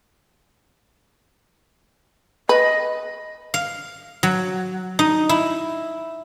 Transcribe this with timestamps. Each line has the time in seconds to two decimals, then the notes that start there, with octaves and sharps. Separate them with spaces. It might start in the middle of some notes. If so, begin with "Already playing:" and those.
2.49 B4 D#5
3.54 F5
4.23 F#3
4.99 D#4
5.29 E4